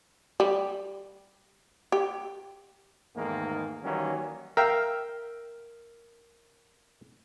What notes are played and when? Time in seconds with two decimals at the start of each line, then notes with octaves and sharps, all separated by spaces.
0.40 G3
1.92 G4
3.16 E2 G#2 D#3 A3 A#3
3.83 D#3 E3 F#3 G3 A#3 C#4
4.57 A#4 E5 F5 G5